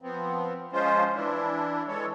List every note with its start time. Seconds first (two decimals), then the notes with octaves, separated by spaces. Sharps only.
0.02 F3 B3 C4
0.73 F3 G#3 C#4 F4 C5
1.15 E3 D4 E4
1.88 E3 G#3 A4 C#5